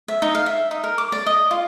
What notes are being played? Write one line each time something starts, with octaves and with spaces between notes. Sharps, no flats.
E5
D#4
F5
E5
D#4
A#4
D6
D5
D#5
F4